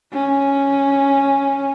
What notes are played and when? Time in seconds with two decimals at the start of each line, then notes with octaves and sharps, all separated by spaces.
0.13 C#4